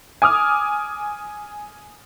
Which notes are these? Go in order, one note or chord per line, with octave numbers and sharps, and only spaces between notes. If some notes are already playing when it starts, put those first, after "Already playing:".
G#5 D6 D#6 F6